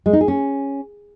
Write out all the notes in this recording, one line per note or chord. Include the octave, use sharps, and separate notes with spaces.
G#3
D#4
G#4
C#4